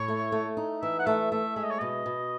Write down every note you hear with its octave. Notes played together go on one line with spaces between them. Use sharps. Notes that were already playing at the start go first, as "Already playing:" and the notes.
Already playing: A2 C#5
A3
A3
D#4
E3 E5
F#5
A3 E5
A3 E5
G#3 E5
D#5
C#5
B2 D#5
B2